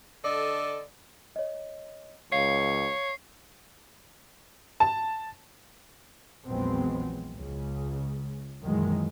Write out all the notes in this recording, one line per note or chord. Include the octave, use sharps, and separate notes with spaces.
D3 A4 D5 D#5
C#5 D#5
C#2 C#5 F5 C7
A5
A#1 E2 F#3 G#3 B3 C4
C#2 C#3
F#2 A#2 D#3 E3 G#3